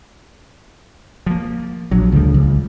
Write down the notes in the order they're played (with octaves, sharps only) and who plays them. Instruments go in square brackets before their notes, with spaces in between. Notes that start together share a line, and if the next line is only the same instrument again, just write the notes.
[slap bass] F3 A#3
[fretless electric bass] A#1 [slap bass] F#3
[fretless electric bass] D2 [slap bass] C#3 F3 G3
[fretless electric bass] C#2